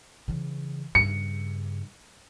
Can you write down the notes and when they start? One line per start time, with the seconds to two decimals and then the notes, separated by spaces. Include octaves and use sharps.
0.28 C#3 E3
0.95 G2 C#3 C#7